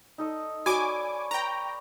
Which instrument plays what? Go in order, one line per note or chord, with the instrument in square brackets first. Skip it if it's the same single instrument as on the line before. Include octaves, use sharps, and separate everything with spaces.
[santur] D#4 A4 D#5
[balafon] F#4 [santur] C#5 D5 [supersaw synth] G#5 D6 [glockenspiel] B5 C#6
[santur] B4 [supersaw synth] G5 A#5